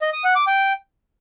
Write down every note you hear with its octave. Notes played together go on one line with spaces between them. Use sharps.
D#5
D#6
F#5
D6
G5